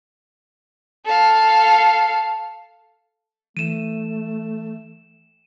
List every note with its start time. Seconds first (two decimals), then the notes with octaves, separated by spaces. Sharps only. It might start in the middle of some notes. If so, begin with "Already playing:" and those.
1.06 A4 F5
3.57 E3 A3 D#7 E7